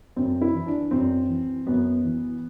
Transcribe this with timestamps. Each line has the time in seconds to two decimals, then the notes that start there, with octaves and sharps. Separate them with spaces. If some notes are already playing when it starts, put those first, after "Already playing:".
0.16 F#2 C4
0.41 E4
0.54 E3
0.66 D4
0.91 F#2 C4
1.29 E3
1.67 F#2 B3
2.04 E3